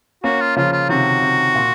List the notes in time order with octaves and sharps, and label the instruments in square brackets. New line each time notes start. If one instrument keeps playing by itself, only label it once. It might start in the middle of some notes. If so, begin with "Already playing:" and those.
[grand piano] A#3 C#4 [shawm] F#4
[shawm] F4
[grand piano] C#3 F3 [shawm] F4
[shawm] F4
[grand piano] C3 D#3 [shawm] F#4
[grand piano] C3
A#2